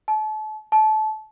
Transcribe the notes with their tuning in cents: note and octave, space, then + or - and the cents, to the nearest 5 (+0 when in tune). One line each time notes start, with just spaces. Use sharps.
A5 -35
A5 -25